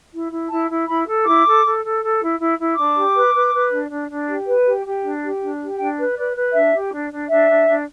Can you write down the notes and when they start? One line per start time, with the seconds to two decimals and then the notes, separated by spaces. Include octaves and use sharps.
0.11 E4
0.30 E4
0.50 E4 A5
0.68 E4
0.87 E4 B5
1.05 A4
1.25 E4 D6
1.44 A4
1.63 A4
1.82 A4
2.01 A4
2.20 E4
2.39 E4
2.57 E4
2.76 D4 D6
2.95 G4
3.13 B4
3.32 B4
3.52 B4
3.70 D4
3.89 D4
4.08 D4
4.27 G4
4.46 B4
4.65 G4
4.83 G4
5.02 D4
5.21 G4
5.40 D4
5.59 G4
5.78 D4 G5
5.96 B4
6.15 B4 D5
6.34 B4
6.53 D4 E5
6.73 G4
6.90 D4
7.10 D4
7.28 D4 E5
7.48 D4
7.66 D4